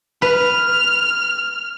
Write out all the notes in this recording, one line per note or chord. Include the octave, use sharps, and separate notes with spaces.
B4 F6